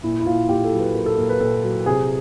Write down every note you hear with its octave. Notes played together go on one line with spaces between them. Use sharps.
A#2 E4
E4
A#2 F4
A#2 G4
A4
F#3
B4
A#2 A#4
A4
A#2 A#4
B4
A#2 A4
F#3
C3 G#4